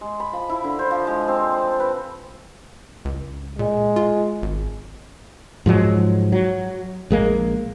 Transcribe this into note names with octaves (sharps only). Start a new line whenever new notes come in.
G#3
B5
F3
E4
D3
C5
F3
G#3
C4
D5
A5
B4
C#2
A#2 G#3
F4
G#1
G#2 F3 F#3 G#3
F#3
A#1 G#3 A#3